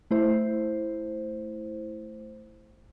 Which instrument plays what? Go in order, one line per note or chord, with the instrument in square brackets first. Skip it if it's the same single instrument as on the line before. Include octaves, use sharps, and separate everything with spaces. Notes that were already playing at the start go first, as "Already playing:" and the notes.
[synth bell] A3 E4 C5